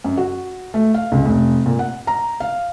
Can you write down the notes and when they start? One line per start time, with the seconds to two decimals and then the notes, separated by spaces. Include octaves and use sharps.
0.04 F#2
0.17 F#4
0.74 A3
0.94 F5
1.12 C#2
1.25 F1
1.66 A#2
1.79 F#5
2.07 A#5
2.40 F5